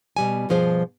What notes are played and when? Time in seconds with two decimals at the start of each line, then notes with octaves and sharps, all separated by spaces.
0.17 B2 G3 G#5
0.49 G2 B2 F3 G#4 C5